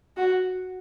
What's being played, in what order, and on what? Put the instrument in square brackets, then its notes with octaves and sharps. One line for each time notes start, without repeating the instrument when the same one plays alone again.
[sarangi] F#4